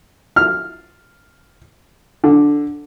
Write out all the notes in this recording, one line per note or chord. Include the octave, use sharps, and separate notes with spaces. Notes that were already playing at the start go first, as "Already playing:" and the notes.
F6
D3